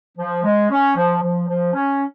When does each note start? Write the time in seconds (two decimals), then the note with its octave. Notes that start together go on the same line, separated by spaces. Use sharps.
0.17 F3
0.43 G#3
0.69 C#4
0.95 F3
1.21 F3
1.47 F3
1.73 C#4